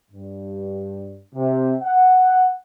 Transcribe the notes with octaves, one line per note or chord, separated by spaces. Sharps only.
G2
C3
F#5